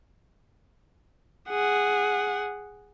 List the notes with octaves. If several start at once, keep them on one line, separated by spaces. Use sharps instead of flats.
G#4 F#5